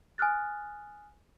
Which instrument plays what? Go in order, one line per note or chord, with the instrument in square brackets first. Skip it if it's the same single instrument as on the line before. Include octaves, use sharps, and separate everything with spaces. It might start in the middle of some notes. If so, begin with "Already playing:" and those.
[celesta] G#5 D#6 F6 F#6 A6